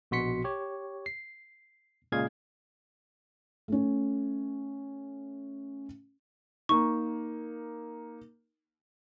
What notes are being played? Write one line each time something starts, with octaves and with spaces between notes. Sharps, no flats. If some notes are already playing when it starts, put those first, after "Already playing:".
A#1 B2 F#4 C6 B6 C#7
G4 C#5
C7
A#2 C#3 G#3 G#4 F5 G#6
A3 C#4
A#3 D#4 C#6